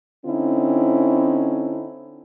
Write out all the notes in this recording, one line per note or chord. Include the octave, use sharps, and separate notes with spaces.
D3 C4 C#4 D#4 E4